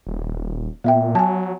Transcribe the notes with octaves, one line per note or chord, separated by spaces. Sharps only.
D#1
A#2 B3 E5 G5
F#3 G#5 A5